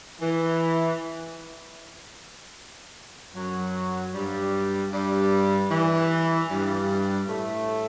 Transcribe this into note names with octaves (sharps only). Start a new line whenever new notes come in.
E3
F#2 F#3
G2 G3
G2 G3
E3
G2 G3
A2 A3